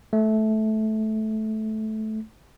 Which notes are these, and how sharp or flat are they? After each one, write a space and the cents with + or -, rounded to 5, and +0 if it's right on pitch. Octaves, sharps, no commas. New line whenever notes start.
A3 -15